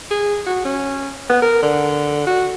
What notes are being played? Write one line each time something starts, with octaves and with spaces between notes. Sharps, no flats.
G#4
F#4
C#4
B3
A#4
D3
F#4